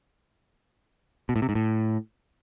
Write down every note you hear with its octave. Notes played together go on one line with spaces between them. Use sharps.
B2
A2
C3
G#2
A2